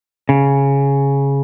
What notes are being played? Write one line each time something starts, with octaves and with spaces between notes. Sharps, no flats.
C#3